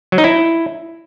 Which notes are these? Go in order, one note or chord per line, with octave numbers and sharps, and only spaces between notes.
F#3
D#4
E4